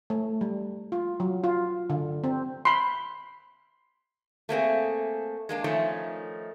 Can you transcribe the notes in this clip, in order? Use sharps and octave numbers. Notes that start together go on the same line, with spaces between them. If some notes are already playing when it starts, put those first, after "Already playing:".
A3
G3
F4
F#3
F4
D3
C4
B5 C6
A3 A#3 C4 G#4
G#3 A#3 D4
D#3 F3 A3 C#4 D#4